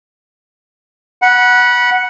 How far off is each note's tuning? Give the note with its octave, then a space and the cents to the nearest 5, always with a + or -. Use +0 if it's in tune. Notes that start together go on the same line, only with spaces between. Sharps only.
F#5 +0 B5 -30